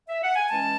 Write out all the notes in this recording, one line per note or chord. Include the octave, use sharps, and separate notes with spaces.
E5
F#5
G#5
E3 G#3 C#4 A5